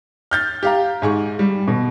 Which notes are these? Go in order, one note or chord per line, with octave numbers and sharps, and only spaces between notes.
F6 G6 A6
G4 F5 A#5
G#2 G#4 C#6
G3
B2